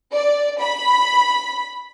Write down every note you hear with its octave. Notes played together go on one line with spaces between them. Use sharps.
D5
B5